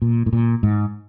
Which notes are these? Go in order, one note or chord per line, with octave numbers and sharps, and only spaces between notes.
A#2
A2
A#2
G#2